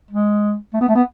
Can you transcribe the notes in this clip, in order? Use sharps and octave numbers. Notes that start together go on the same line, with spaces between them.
G#3
A3
B3
A3
B3